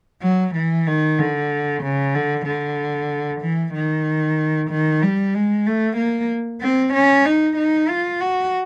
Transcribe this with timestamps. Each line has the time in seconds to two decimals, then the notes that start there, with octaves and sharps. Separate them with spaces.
0.22 F#3
0.55 E3
0.87 D#3
1.19 D3
1.83 C#3
2.15 D3
2.46 D3
3.41 E3
3.74 D#3
4.70 D#3
5.02 G3
5.34 G#3
5.66 A3
5.97 A#3
6.61 C4
6.94 C#4
7.26 D#4
7.57 D#4
7.89 F4
8.21 F#4